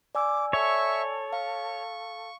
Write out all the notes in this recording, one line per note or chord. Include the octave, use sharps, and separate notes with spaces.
D5 G#5 D6 E6
A4 C#5 E5 C#6
F5 C#6